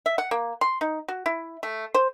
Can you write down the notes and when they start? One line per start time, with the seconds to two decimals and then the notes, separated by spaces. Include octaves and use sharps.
0.06 E5
0.18 F#5
0.31 A#3
0.61 C6
0.81 D#4
1.08 F#4
1.26 E4
1.63 A3
1.95 C5